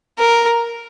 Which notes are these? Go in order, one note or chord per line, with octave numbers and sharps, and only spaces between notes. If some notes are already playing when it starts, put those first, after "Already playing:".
A#4